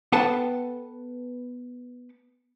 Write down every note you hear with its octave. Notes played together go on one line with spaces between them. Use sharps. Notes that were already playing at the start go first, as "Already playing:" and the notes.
B3 A4 B4 F#5 G5 A5